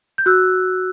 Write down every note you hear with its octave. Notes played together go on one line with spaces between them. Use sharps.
G6
F#4 E6 F#6